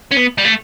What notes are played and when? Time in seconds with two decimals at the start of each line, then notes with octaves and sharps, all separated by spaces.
0.12 C#4
0.17 B3
0.38 G3
0.45 A3